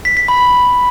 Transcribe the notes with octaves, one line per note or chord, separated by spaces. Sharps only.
B6
B6
B5